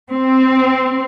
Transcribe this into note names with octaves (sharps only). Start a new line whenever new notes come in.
C4